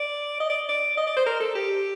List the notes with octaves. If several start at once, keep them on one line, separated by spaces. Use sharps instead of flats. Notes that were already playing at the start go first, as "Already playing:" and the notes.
Already playing: D5
D#5
D5
D5
D#5
D5
C5
A#4
A4
G4